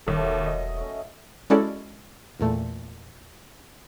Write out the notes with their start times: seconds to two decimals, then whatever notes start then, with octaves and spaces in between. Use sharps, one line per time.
0.07 E1 D#2 A3 A4 E5
0.22 F#3
0.46 D#5
0.77 A3 C#4
1.50 G#3 C#4 E4 F#4 A4 D5
2.40 E2 A#2 A3